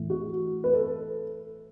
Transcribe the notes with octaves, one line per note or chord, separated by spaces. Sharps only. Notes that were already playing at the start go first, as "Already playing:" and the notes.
Already playing: A2 E3
F#4
B4
A4